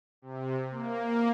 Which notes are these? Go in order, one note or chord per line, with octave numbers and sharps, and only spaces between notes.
C3
A#3